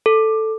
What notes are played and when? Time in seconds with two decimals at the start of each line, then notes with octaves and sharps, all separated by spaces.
0.06 A4